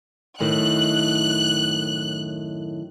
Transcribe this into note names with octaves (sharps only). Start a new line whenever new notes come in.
F#2 A2 D#3 F#6